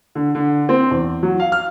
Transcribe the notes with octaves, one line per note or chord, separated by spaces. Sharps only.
D3
D3
C4
E2
F#3
F5
F6